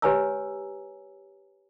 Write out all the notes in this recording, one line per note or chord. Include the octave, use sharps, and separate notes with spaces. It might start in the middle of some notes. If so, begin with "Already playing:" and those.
G4 B4 C#5 G#5 A#5 E6